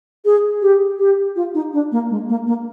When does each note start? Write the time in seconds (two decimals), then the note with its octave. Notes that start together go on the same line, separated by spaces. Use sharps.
0.25 G#4
0.62 G4
0.99 G4
1.36 F4
1.54 D#4
1.73 D4
1.92 A#3
2.10 G#3
2.28 A#3
2.46 A#3